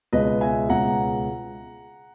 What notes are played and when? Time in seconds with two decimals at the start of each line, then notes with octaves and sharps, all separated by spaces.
0.13 C#2 B2 G#3 B3 B4 D#5
0.41 E5 G#5
0.69 C#2 B2 G#3 B3 F#5 A#5